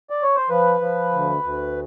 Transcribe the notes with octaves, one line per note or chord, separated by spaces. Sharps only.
D5
C#5
C5
F3 B4
F3
D2
D2